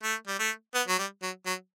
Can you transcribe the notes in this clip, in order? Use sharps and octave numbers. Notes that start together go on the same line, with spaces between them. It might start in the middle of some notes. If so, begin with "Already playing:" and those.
A3
G3
A3
B3
F#3
G3
F#3
F#3